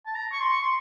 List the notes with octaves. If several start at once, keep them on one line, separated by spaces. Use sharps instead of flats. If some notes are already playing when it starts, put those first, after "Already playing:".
A5
A#5
C#6
C6
C#6
C6